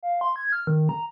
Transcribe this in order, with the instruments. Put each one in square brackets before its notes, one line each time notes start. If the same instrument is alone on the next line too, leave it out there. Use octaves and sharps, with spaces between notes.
[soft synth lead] F5
C6
G#6
F6
D#3
A#5